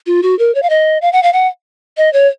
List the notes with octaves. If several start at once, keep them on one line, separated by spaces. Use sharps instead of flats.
F4
F#4
A#4
C#5
F5
D#5
F5
F#5
F5
F#5
D#5
C#5